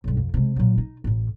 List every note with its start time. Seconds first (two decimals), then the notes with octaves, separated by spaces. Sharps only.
0.04 B1 G2
0.17 F2
0.34 C3 G#3
0.56 A#2 F#3
0.78 D#4
1.04 A1 A2